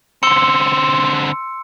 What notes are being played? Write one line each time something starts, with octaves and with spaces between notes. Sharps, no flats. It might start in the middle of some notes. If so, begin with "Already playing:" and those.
D3 C4 C6 E6 C#7